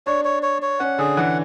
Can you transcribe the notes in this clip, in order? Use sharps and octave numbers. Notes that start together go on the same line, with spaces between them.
D4 C#5
C#5
C#5
C#5
C#4 F#5
D3 G#4
E3 F#5